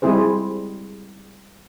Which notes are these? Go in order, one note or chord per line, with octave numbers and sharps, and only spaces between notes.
G3 G#3 C4 E4 G#4 C5